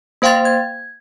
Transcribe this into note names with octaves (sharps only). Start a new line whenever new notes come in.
A#3 C5 F5 G5 C6 A6
G#6